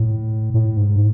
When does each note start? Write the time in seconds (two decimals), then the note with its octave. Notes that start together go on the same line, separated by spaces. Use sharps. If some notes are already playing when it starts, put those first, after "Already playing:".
Already playing: A2
0.54 A2
0.77 G#2